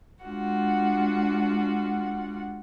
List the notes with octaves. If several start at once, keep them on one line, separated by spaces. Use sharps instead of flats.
G#3 D4 F4 F#4 F#5